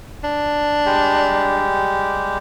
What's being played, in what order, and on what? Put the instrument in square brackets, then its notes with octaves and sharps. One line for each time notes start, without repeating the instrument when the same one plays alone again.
[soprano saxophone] D4
[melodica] G3 G#3 G4